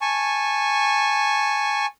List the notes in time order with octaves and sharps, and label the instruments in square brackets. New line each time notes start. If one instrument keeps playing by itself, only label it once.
[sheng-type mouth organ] G#5 A5 C#6